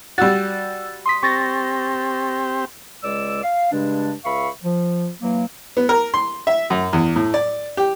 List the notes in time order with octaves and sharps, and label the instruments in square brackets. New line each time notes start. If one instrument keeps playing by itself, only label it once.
[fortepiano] G3 F#4 [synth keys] E6 A6
[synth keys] C6 D#6 B6
[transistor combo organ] C4 G4 [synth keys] C#6 A6 A#6
[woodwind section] C#2 G#3 D5 E6
F5
G2 C#3 G#3 D4
C#2 E5 F5 B5 C#6
F3
E3 F#3 A#3
[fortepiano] B3
A#4
C6
E5
F#2
E2
A2
D5
G4